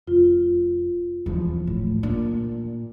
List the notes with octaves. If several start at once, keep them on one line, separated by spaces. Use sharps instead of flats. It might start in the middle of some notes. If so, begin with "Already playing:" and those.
F1 F4
E1 D#2 E3 F3
A2
A#2 D4